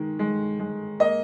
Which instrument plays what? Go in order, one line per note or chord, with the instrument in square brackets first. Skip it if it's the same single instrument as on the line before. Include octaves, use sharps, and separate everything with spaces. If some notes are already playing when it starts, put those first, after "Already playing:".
Already playing: [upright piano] D#3 G#3
G#3
G#3
A#3 D#5